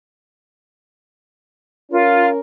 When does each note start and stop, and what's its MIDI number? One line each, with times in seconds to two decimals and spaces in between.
1.91 2.40 61
1.91 2.26 65
1.91 2.40 70